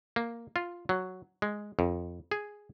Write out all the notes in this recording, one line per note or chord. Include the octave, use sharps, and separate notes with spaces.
A#3
F4
F#3
G#3
F2
G#4